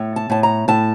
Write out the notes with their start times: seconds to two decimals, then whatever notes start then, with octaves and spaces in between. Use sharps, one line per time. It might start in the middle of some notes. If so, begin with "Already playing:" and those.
Already playing: A2
0.16 A5
0.30 A2 A5
0.43 A#5
0.68 A2 A5